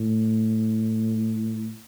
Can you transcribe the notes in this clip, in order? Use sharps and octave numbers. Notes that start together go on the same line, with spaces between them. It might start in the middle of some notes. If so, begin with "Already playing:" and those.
Already playing: A2